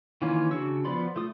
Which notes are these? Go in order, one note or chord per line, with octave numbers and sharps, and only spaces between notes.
D#3 E3 A#3 C#4 F4
C#3 D4 F#4 C#6 E6
F3 B3 D5 B5 C6
A3 F4 D#6